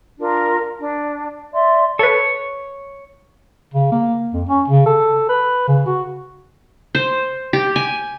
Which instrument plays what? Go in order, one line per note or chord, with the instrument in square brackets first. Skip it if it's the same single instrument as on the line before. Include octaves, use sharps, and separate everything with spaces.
[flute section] D4 F4 A#4
D4
D5 E5 C6
[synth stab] A4 B4 [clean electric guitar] C#5
[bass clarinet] C#3
A#3
F2
C#4
C#3
A4
B4
C#3
F#4
[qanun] C5
G4
G#5